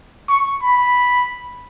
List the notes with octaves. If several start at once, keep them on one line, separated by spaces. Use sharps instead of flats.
C#6
B5